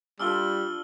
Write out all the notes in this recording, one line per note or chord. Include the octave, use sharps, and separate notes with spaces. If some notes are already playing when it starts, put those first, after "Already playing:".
G3 D4 F4 A4 E6 F6 G7